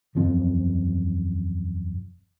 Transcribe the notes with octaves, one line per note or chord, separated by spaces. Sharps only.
E1 F#2 F3 C4